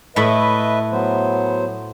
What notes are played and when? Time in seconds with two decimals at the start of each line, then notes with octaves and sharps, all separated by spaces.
0.16 A2 A3 B4 D#5 E5 B5
0.91 F#3 B3 C5